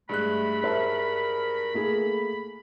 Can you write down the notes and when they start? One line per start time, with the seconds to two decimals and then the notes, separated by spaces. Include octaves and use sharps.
0.09 G2 G#3 A3 B5 F#6
0.64 A#4 C5 E5 A5
1.74 A3 A#3 G#4